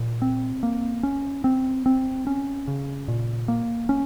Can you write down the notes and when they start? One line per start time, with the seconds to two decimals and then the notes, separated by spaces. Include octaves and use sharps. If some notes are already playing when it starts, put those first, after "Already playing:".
Already playing: A#2
0.22 C4
0.63 A#3
1.03 C#4
1.44 C4
1.86 C4
2.27 C#4
2.68 C#3
3.08 A#2
3.48 A#3
3.89 C#4